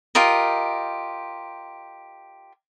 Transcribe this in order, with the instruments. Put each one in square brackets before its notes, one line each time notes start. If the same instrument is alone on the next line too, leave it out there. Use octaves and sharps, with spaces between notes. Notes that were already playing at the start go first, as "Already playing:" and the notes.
[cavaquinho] F4 G4 A#4 D#5